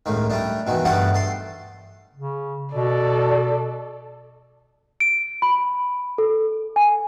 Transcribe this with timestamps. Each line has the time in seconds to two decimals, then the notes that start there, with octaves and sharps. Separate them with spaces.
0.06 C#2 A2 D#3
0.30 G3 A3 D4
0.67 B2 D#3 E3
0.85 G2 G3 A3 B3 D5 F#5
1.14 A4 C6
2.14 C#3
2.74 B2 A4 D5
5.00 D7
5.42 B5
6.18 A4
6.76 G#5